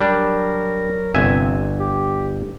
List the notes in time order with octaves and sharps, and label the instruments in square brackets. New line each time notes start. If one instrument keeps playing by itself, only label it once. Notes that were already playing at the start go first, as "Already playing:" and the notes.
[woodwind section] F#3 A#4 [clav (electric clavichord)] G3 D4
[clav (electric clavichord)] G1 E5 G#5 [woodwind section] C3 C4
[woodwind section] G4